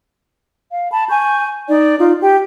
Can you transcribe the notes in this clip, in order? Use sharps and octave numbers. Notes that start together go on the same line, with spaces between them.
F5
A5 B5
G#5 C#6 G6
D#4 D5
D#4 F4
G4 G5